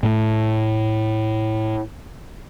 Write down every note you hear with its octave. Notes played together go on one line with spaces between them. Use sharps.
A2 A3